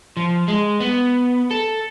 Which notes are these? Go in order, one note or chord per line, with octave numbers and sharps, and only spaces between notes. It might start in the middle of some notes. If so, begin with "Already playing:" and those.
F3
G#3
B3
A4